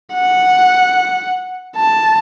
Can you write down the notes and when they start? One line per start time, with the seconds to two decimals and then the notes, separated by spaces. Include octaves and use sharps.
0.15 F#5
1.76 A5